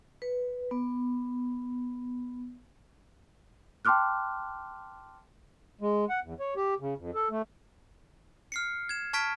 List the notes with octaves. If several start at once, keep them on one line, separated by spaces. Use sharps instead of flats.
B4
B3
G5 A5 C6 D6 F6 F#6
G#3
F#5
E2
C#5
G4
C#3
F2
A4
A3
F6 C7 C#7
G#6 E7
A5 C#6 F6 G#6 B6 D7